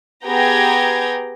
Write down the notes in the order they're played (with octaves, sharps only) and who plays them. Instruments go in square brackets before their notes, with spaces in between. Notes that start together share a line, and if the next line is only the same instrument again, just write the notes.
[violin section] B3 G4 G#4 G5 A#5 G#6